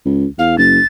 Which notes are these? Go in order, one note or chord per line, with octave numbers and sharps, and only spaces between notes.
C#2
E2 F5
F#1 A6